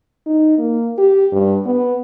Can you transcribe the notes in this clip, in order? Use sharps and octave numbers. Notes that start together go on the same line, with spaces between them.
D#4
A#3
G4
G2
B3